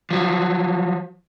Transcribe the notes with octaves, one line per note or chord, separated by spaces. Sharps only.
F3 F#3